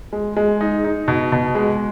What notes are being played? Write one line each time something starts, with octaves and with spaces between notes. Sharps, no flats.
G#3
G#3
D#4
D#4
B2
B2
G#3